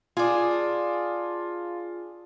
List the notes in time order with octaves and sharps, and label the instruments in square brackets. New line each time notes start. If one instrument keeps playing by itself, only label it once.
[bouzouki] D4 G#4 [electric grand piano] F4